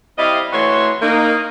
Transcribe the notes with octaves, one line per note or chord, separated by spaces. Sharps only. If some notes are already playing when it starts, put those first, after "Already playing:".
G3 C4 E4 D#5 F5
E3 A3 F#4 C#5 C6
A#3 D#4